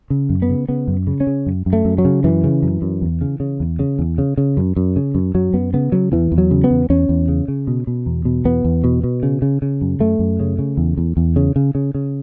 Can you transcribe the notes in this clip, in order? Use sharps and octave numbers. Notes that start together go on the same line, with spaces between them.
C#3
F#2
B3
C#3
C#3 B3
F#2
C#3
C#4
C#3
F#2
F#2
A3
F#2
F#3
C#3
F#2 E3
C#3
F#2
F#2
E2
C#3
C#3
E2
C#3
E2
C#3
C#3
F#2
F#2
C#3
F#2
F#2 F#3
F#2 B3
C#3 B3
C#3 F#3
E2 E3
E2
F#3
C#3
B3
E2
E2 C#4
E2
C#3
C#3
B2
B2
E2
B2
E2 B3
E2
B2
B2
C#3
C#3
C#3
F#2
F#2 A3
F#2
C#3
C#3
E2
E2
E2
C#3
C#3
C#3
C#3